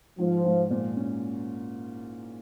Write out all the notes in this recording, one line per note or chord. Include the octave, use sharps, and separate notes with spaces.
G#2 F3
G#2
A#2
C#4